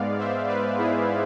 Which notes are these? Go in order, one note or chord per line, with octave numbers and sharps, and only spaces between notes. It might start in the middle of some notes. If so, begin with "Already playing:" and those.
Already playing: G#2 G#3 B3 D5 F5
C5 E5
B4 D5
E4 G#4